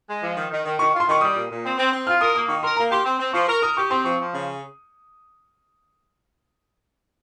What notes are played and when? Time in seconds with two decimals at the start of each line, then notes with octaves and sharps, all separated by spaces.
0.09 G#3
0.22 F3
0.37 D#3
0.51 D#3
0.65 D#3
0.79 D#3 C#6
0.94 F4
1.00 C6
1.08 D#3 C#6
1.21 G3 D#6
1.36 A#2
1.50 A#2
1.64 C4
1.78 C4
1.92 C4
2.07 F4 F6
2.21 A#4 D#6
2.35 A#3 D#6
2.48 D#3 C#6
2.63 A#4 C6
2.77 A#3 A#5
2.91 G4 C6
3.05 C4
3.19 C4
3.33 F3 C#6
3.48 A#4 C#6
3.62 A#4 D#6
3.77 G4 C#6
3.90 C4 C6
4.04 F3 C#6
4.19 F3
4.33 C#3